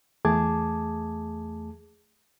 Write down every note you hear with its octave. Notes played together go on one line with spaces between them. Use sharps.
E2 A3 G#4 A5 D6 G#6